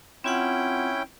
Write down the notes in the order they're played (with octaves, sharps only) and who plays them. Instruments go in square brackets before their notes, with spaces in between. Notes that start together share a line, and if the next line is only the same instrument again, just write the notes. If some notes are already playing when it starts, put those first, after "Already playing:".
[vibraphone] C4 F4 F#5 [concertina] C#4 E4 G5